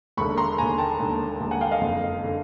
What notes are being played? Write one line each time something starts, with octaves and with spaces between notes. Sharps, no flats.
E1 D#2 D3 B5 C#6
A#5 C6
E1 D#2 D3 G#5 A#5
G5 A5
E1 D#2 D3
E1 D#2 D3
F#5 G#5
F5 G5
D#5 F5
F#1 F2 D3
D3